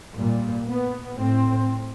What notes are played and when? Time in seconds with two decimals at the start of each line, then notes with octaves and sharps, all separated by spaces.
0.17 A#2 G3
0.68 B3
1.19 A2 C4